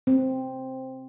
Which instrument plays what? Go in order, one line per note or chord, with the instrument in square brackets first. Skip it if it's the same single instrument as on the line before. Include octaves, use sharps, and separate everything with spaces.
[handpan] C4